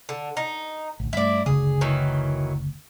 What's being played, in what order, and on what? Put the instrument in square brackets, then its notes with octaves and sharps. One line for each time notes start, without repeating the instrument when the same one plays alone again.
[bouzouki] D3
D#4
[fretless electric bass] A1 D2
[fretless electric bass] G2 A3 [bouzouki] E4 D5
[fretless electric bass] F#1 D2 C#3 [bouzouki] G#4
[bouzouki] D#3 E3 F#3